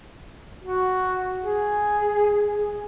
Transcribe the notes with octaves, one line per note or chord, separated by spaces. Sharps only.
F#4
G#4